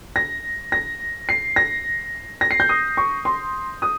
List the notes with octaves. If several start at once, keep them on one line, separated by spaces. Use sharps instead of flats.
A#6
A#6
C7
A#6
A#6
C7
G6
D#6
C#6
C6
D#6